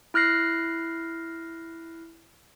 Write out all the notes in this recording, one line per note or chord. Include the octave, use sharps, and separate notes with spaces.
E4 F6 F#6 A#6 C7